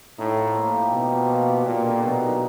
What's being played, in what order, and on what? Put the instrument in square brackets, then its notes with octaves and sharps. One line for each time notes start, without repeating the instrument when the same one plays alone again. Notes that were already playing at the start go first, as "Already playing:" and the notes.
[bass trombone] A2 [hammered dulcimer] D#4
[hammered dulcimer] F3
A#3
G4
[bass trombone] B2 [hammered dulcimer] D#4
[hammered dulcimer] F3
A#3
G4
[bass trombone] A#2 [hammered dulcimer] A#3
[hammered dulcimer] D3
[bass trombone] B2 [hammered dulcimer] F#3
[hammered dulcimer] D#4